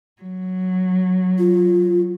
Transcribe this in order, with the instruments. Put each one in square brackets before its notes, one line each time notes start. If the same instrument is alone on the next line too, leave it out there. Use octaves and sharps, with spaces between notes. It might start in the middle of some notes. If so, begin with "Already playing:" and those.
[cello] F#3
[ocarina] F4